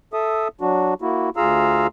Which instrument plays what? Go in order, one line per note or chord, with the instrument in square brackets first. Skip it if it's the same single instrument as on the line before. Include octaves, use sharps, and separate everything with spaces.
[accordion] A4 E5 D#6
F#3 D4 F#4
A#3 E4 F#4
D2 F4 G#4 F5 A#5 E6